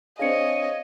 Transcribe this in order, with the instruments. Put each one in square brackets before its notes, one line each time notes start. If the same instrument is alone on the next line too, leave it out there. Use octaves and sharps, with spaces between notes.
[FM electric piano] C4 D4 G#4 [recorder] C#5 [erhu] D#5 [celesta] F5 C#7